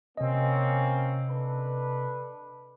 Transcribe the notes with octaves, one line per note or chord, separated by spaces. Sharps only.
C3 A#3 C4 C#4 D#5
D4 A4 B4